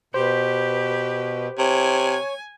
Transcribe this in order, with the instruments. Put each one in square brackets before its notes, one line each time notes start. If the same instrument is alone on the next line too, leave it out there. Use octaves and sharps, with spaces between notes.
[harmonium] B2 [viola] G4 B4 [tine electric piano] C5
[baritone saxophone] C3 [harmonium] C#5 [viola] G#5